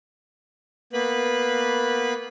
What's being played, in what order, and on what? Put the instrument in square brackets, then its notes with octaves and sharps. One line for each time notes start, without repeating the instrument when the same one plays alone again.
[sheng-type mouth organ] A#3 B3 B4 B5